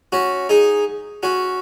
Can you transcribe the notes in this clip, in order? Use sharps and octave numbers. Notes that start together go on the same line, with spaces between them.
C#4 F#4
D#4 G#4
C#4 F#4